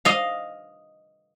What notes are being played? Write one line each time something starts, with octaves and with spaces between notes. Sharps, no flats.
D#5 F5